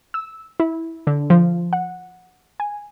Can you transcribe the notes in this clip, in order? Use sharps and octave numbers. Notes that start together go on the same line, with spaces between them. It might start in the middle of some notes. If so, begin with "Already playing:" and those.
E6
E4
D3
F3
F#5
G#5